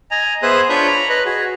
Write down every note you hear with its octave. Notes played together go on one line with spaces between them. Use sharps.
D#5 G#5 A#5
B3 G#4 C5 E5 D#6 F#6
D4 F4 C#5 B5 C#6 G6
A#5 B5
B4 D#5 B5
F#4 G#4